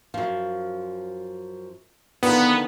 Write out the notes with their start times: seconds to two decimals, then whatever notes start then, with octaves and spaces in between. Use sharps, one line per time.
0.14 F#2 F3
2.23 D3 D#3 F3 B3